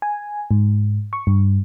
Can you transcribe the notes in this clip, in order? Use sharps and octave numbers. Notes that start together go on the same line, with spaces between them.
G#5
G#2
C#6
G2